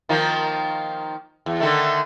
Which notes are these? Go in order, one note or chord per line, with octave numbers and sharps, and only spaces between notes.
D#3 F3 A#3
E2
D3 D#3 A3